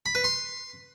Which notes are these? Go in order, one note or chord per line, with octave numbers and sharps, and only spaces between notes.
B5
B4
C6